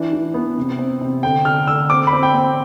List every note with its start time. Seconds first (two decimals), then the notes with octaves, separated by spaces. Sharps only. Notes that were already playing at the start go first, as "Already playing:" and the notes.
Already playing: E3 D4
0.13 E3
0.34 B3
0.58 C3
0.79 C4
1.01 C3
1.23 D3 G5
1.45 D3 F6
1.67 D3 E6
1.90 C4 D6
2.07 B5
2.13 C4
2.23 G5
2.34 C4